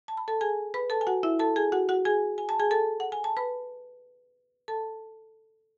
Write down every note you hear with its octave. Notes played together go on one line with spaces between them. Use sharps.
A5
B5
A4 A5
G#4 G#5
B4 B5
A4 A5
G#5
F#4 F#5
E4 E5
A4 A5
G#4 G#5
F#4 F#5
F#4 F#5
G#4 G#5
G#5
A5
G#4 G#5
A4 A5
F#5
G#5
A5
B4 B5
A4 A5